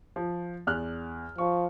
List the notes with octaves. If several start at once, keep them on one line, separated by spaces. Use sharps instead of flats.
F3
E2 F6 F#6
F3 C#6